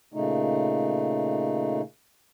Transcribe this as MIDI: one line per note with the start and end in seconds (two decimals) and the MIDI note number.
0.14 1.81 46
0.14 1.81 49
0.14 1.81 57
0.14 1.81 63